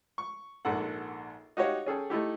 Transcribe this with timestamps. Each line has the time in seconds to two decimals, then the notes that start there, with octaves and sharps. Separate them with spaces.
0.18 C#6
0.65 A#1 G#2 A4 F#5
1.57 D#4 F#4 G4 C#5 F5
1.86 C#4 G#4 A4 G5
2.10 A3 D#4 E4 G4